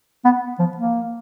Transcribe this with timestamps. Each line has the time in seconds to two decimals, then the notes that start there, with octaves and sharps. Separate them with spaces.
0.25 B3
0.59 F3
0.77 A#3